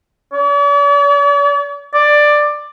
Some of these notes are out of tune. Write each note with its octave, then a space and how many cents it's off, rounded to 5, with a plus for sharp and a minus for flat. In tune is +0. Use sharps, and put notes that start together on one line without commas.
D5 -45
D5 +10